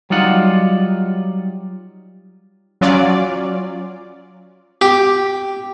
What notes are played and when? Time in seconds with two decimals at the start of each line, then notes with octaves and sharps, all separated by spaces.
0.10 F#3 G3 D#4 F4 F#5
2.81 F#3 C#4 F4 D5
4.81 G4